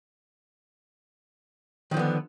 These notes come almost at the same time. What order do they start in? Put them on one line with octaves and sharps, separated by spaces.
D#3 F3 D3 B3